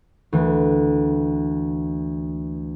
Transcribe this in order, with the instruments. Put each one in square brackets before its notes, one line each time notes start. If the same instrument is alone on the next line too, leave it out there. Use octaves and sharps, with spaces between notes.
[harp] D2 E3